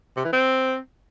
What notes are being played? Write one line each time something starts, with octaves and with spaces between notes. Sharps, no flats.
C3
E3
C4